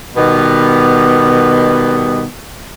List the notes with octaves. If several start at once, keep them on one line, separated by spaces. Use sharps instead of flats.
B2 D#3 G3 B3